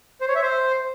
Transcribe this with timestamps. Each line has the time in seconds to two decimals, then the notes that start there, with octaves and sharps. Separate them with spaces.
0.21 C5
0.28 C#5
0.35 E5
0.42 C5